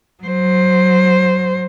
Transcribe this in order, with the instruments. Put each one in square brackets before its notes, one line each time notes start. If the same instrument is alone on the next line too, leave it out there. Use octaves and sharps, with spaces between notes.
[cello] F#3 C5